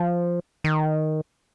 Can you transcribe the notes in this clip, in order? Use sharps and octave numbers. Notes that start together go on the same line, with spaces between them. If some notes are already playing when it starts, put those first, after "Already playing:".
Already playing: F3
D#3